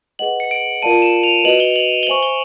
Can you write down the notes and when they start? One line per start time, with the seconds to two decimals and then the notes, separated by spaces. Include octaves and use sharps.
0.19 G#4 B4 D#5 F#5 F#7
0.40 C#7
0.51 D7
0.82 F4 A#4 D5 F5 A5 D#7
1.02 E7
1.23 F7
1.44 F#4 B4 D#5 F#7
1.60 G7
1.76 F#7
2.03 G7
2.07 C5 E5 G#5 C#6 F#7
2.23 G7